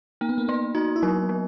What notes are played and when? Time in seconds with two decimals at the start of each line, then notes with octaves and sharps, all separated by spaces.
0.21 A#3 D#4
0.29 B3
0.38 A#3
0.48 A#3 B3
0.75 D#4 F#4
0.96 E4
1.02 F#3 D#4
1.29 F#3